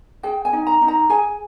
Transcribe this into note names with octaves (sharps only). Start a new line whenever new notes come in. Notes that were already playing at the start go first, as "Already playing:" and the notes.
G#4 G5
G#5
D#4
A#5
D#4
A#5
G#4 G#5